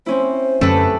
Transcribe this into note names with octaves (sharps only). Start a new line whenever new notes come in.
C4 C#4 E4 C5
F#2 D3 A3 C#4 G4 B4